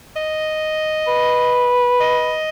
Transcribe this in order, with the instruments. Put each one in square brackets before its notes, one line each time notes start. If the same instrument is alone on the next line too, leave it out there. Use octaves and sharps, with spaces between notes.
[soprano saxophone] D#5
[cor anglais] B4
[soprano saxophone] D#5